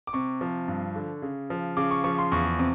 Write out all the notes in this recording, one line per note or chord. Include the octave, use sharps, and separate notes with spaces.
D6
C3 C#6
F3
G2
D3
C#3
F3
C#3 D6
C#6
F3 C#6
C6
E2 C#6
C3